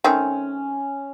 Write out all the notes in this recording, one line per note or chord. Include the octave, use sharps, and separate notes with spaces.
D#3 A3 C4 C#4